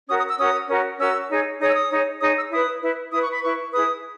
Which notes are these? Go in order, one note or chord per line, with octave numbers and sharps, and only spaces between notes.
C#4 F#4 A#4 D#6
D#6
E6
C#4 F#4 A#4 D#6
C#4 F#4 A#4
C#4 F#4 A#4 E6
D#4 G#4 C#5
D#4 G#4 C#5 D#6
E6
D#6
D#4 G#4 C#5
D#4 G#4 C#5 D#6
E6
E4 B4 D#6
E4 B4
E4 B4 D#6
C#6
B5
E4 B4 C#6
E4 G#4 B4 D#6